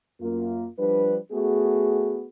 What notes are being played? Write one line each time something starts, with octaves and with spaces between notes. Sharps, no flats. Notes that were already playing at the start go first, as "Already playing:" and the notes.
F#2 A#3 F4
F3 G3 D4 B4
A3 B3 F#4 G#4